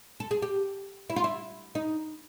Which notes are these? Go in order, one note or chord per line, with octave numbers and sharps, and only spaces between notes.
A4
G#4
G4
E4
F4
E4
D#4